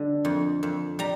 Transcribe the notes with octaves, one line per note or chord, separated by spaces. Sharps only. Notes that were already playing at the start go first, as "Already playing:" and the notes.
Already playing: D3 G3
F2
F2
G3 A#5